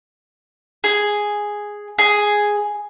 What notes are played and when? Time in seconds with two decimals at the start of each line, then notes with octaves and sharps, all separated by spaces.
0.84 G#4
1.99 G#4